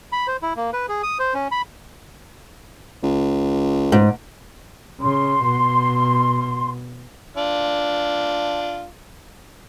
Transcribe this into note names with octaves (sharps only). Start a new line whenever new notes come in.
B5
C5
E4
A#3
B4
G#4
D#6
C5
C#4
B5
C#2
G#2
C#3 C6
B2
D4 F4